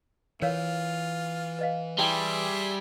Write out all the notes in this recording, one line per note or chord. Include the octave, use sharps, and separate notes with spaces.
E3 F4 A#4 C#5 F5
B4 D#5 F5
G3 E4 G#4 E5 G5 A5 C6